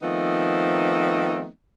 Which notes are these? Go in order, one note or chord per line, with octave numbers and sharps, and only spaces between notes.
D#3 F3 A3 B3 C4 D#4